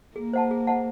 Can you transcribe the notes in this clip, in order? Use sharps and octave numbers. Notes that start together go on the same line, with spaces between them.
A#3 G#4
C5 D#5 F#5 A5
G#4
C5 D#5 F#5 A5